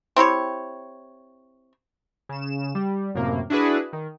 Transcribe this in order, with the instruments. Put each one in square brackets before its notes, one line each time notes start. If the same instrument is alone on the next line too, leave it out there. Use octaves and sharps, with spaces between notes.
[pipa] C4 E4 G4 C#5
[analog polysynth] C#3 E7
G3
F#2 A2 C3 A#3
D4 E4 F#4 G#4 B4
D#3